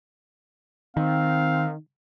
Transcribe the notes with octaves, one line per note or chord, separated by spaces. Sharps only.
D#3 C4 F5